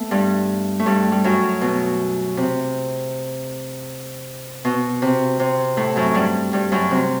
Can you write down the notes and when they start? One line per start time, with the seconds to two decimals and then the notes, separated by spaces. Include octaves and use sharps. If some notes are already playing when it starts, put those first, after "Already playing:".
Already playing: A3 B3
0.11 G2 G3
0.79 A3
0.86 G2 G3
1.12 G3
1.24 F#2 F#3
1.61 B2
2.37 C3
4.65 B2
5.02 C3
5.39 C3
5.77 A2 A3
5.96 F#2 F#3
6.14 G2 G3
6.53 G2 G3
6.72 F#2 F#3
6.91 C3